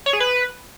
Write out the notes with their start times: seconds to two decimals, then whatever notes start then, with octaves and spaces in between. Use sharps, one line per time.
0.06 C#5
0.13 G#4
0.20 B4